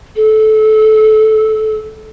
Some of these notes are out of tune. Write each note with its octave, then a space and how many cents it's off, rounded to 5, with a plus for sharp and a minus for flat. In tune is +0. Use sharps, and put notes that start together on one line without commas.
A4 -20